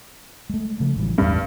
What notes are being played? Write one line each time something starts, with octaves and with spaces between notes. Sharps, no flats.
G#3 A3
C#3 F3 A3
A1 E3 G3
D1 A1 E2 G2